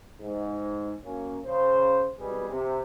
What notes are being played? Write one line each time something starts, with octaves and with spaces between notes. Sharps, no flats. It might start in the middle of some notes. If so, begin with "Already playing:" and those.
G#2
F#2 A#3 C#4
C#3 C5
G#1 B2 G3 G#4 B4
C3